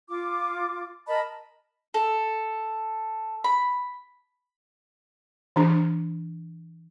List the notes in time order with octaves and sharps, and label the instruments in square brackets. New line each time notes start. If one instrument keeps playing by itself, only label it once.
[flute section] F4 D6
A#4 D#5 A5 B5
[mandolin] A4
B5
[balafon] E3 D4